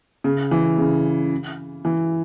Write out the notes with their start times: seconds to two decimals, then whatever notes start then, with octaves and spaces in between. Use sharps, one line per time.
0.24 C#3
0.51 E3
0.78 C#3
1.85 E3